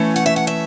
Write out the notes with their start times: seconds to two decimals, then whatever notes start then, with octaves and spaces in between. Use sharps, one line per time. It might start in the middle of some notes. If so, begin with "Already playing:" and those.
Already playing: E3 A3 C#4
0.16 F#5
0.26 E5
0.36 F#5
0.47 E5